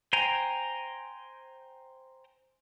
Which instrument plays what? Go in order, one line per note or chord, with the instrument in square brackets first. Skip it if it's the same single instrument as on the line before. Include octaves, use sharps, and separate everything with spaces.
[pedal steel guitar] C5 G5 G#5 A#5